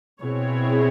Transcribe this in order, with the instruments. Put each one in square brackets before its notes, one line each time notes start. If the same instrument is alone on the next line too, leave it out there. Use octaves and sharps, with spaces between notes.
[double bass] B2 [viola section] C4 E4 G#4 C#5